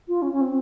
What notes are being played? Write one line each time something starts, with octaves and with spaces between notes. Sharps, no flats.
F4
C#4
C#4
C4